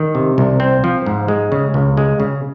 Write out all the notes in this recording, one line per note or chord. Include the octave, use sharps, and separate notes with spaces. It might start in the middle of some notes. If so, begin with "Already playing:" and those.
Already playing: D#3
C3
C2
C4
F3
G#2
G#3
C#3
C#2
G#3
C#3